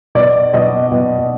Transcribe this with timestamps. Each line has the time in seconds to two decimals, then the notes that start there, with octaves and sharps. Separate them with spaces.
0.15 B2 D5
0.53 B2 D#5
0.92 B2